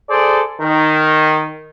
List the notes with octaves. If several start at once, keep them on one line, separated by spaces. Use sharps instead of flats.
G#4 A4 C5 D5
D#3